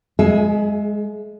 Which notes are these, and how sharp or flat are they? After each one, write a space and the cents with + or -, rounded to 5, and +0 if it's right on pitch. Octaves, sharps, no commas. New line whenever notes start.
G#3 +0 G#4 +35 E5 +10